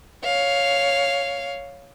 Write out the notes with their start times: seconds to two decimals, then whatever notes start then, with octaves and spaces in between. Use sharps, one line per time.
0.24 C#5 F5